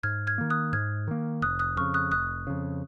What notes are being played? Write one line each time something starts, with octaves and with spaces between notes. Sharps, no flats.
G#2 F6 G#6
F6 G#6
D#3 A#3
D#6 F#6
G#2 F6 G#6
D#3 A#3
F1 D#6 F#6
D#6 F#6
F2 C#3 C#6 F6
D#6 F#6
F1 D#6 F#6
F2 C#3